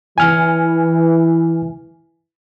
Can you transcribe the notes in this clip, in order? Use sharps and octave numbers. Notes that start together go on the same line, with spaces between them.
E3 G#5 F6